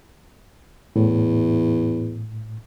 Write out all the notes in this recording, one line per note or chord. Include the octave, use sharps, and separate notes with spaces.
E2 A2